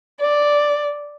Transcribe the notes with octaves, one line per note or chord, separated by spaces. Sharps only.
D5